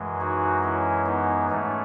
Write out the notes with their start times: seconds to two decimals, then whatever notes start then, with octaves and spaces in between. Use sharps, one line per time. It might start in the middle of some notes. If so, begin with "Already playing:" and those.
Already playing: F#2 E3 G#3
0.20 D#4 F#4
0.63 C#4 E4
1.06 B3 D#4
1.50 G#2 E3 A3 C#4